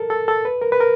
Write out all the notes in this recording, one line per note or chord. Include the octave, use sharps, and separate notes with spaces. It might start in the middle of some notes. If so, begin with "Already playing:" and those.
Already playing: A4 A#4
A4
A4
B4
A#4
B4
A#4